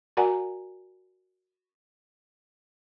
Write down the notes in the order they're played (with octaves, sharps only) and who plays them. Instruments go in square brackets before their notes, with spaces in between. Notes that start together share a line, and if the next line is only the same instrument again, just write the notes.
[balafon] F#4 A#4 D5 F#5 G#5 A#5